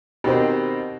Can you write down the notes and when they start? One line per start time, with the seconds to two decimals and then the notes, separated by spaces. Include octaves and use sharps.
0.24 B2 D#3 C4 G4 C5